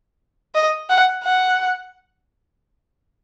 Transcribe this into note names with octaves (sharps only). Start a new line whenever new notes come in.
D#5
F#5
F#5